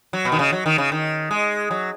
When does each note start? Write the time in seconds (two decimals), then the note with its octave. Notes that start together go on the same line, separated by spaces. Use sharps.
0.13 F#3
0.25 B2
0.32 D#3
0.39 C#3
0.53 F#3
0.66 D#3
0.78 C#3
0.92 D#3
1.31 G#3
1.71 F#3